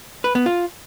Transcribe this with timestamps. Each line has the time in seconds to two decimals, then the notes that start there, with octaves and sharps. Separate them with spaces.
0.24 B4
0.35 B3
0.46 F4